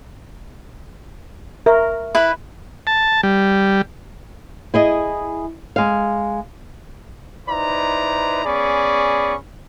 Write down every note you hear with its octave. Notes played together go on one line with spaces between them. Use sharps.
A#4 E5 C#6
E4 B4 B5
A5
G3
E4 G#4 D#5
G#3 F5
D#4 E4 B4 C5 D5 A#5
B3 C#4 G#4 D5 B5 C#6